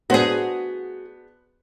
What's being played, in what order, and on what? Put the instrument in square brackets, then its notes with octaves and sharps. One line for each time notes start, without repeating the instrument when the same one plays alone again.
[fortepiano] B3 D4 C5 [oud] F#4 G#4